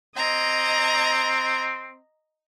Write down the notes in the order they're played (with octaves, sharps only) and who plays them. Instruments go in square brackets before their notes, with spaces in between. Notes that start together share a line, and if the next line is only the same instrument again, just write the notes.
[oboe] C4 [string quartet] D#5 A#5 G#6